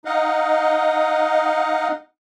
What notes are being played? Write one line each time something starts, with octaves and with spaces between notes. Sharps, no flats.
D#4 D#5 F5 F#5